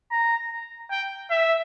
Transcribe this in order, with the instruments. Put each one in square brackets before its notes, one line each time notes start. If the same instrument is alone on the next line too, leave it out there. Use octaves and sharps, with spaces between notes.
[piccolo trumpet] A#5
G5
E5